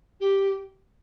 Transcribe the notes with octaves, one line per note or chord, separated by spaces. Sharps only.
G4